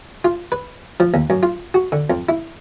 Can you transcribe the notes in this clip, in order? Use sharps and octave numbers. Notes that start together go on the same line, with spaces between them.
F4
B4
F3
D#2
F#2
F4
F#4
D3
F2
E4